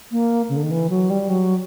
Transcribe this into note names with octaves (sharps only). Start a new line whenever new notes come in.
A#3
C#3
D3
D#3
E3
F#3
G3
F#3